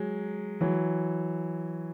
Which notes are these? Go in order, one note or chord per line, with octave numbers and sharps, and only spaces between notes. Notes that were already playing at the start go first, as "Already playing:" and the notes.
Already playing: F#3 G#3
E3 F#3